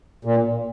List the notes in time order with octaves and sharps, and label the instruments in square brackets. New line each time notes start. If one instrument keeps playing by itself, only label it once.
[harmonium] A#2